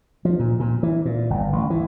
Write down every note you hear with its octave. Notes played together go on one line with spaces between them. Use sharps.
F3
A#2
A#2
E3
A#2
G1
A1
E3